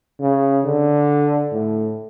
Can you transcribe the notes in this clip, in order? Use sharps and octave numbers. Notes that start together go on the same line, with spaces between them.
C#3
D3
A2